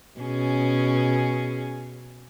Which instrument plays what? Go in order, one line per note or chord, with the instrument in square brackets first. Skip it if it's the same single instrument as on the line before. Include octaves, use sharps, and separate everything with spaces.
[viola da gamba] B2 C#4 G#4